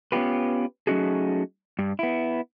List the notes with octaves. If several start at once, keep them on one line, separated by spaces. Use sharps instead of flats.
B3 C#4 E4 F4 G4 B4
F#3 A3 C#4 D#4 F#4 G#4
G2
B3 E4